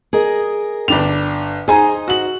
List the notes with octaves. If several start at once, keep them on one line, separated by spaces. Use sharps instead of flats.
G#4 A#4 D#5
G1 D4 G5 F7
D#4 G#4 C5 D#5 G#5 A#5
F#4 F#7